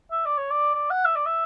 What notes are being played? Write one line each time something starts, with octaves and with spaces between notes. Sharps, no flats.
E5
D5
C#5
D5
D5
F#5
E5
D5
E5